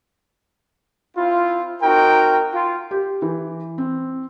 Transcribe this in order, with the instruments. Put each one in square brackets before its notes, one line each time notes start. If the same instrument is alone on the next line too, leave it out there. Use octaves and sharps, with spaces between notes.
[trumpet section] C4 E4 F4
C4 D#4 F#4 A#4 G5
F4
[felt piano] G4
E3
C4